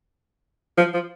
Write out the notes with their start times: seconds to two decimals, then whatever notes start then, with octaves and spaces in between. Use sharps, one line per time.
0.78 F3
0.94 F3